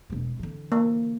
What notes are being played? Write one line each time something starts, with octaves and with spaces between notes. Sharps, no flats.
E1 G#3
D3 E3
A#3